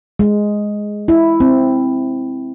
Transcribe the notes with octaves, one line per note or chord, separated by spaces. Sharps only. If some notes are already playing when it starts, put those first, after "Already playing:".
G#3
E4
C4